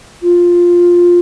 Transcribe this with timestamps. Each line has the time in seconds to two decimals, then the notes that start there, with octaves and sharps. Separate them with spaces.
0.21 F4